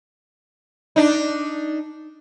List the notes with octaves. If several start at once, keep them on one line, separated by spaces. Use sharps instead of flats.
D4 D#4